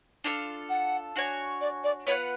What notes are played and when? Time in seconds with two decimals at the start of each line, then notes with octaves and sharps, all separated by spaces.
0.24 D4 F4 A4
0.70 F#5
1.16 D4 F#4 C#5 G#5
1.61 D5
1.84 D5
2.07 B3 F4 B4 C#5 F#5